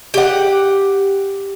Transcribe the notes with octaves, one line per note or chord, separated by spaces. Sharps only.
G4 F#5